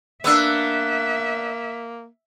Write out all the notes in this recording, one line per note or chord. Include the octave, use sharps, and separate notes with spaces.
A#3 B3 D4 B4 E5 E6 F#6